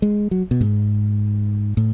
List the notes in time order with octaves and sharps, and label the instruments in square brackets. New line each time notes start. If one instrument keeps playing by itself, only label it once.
[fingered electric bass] G#3
F#3
B2
G#2
A2